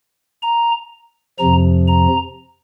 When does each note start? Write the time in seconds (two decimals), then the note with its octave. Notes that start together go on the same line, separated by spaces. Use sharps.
0.42 A#5
1.39 F2 C3 F3 A#5
1.88 A#5